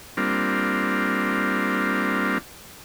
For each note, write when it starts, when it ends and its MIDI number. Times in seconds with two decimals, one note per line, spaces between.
0.17 2.38 55
0.17 2.38 58
0.17 2.38 60
0.17 2.38 62
0.17 2.38 65